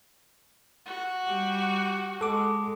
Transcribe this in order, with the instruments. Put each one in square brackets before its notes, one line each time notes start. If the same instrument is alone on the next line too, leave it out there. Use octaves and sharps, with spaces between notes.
[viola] F#4
[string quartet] G3 G4
[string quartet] G#3 [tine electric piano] A4 D6